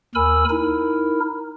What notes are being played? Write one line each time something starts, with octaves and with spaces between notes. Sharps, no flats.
D#2 A#4 G#5 B5 E6
D#4 E4 A#4